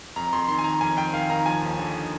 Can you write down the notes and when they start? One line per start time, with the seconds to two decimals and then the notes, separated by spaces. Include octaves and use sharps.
0.16 F2 A#5
0.33 F2 C6
0.48 D#3 C6
0.59 G#5
0.64 D#3 A#5
0.81 F2 G#5
0.97 F2 G5
1.13 D#3 F5
1.30 D#3 A#5
1.46 F3 G#5
1.62 D#2
1.79 D3